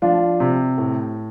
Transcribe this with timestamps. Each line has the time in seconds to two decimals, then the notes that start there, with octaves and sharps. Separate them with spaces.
0.02 F3 D4 F4
0.40 C3
0.78 A2